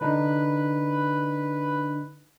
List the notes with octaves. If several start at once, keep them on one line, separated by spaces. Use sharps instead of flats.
D3 D4 D#4 B4